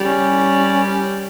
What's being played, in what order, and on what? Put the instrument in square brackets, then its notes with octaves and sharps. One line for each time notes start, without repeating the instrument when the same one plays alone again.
[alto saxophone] G3 [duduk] C#4